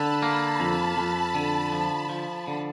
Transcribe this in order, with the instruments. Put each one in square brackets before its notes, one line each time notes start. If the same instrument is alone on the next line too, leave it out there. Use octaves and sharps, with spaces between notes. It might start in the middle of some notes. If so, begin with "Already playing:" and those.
Already playing: [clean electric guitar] D3 [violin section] A5 B5
[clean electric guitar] A#3
F2
F2
D3
F3
F3
D3